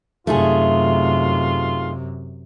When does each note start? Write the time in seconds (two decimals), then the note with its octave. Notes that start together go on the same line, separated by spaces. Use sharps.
0.27 F#2 C3 A3 D#4 F4 G#4